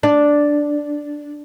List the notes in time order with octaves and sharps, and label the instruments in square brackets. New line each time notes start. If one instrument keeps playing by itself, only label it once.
[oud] D4